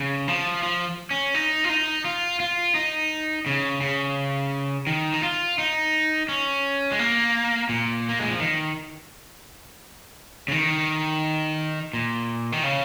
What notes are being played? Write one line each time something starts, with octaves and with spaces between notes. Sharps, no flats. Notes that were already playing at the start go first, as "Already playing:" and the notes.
Already playing: C#3
F3
F3
C#4
D#4
F4
D#4
F4
F4
D#4
C#3
C#3
D#3
D#4
F4
D#4
C#4
G#3
A#3
A#2
A#3
G#3
F3
D#3
C#3
D#3
A#2
D#3
C#3